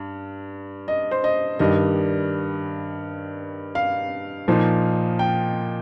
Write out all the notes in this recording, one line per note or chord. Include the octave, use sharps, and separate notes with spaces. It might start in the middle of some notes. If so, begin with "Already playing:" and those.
Already playing: G2
D#5
C5
D#5
G2 D#3 G3 D#5
F5
A#2 F3 A#3 D#4
G5